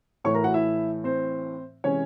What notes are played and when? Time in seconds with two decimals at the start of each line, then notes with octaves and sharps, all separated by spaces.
0.24 A2 E3 A3 C#5 C#6
0.34 A#4 A#5
0.44 F#4 F#5
0.54 E4 E5
1.04 C4 C5
1.84 C3 E3 G#3 C#4 C#5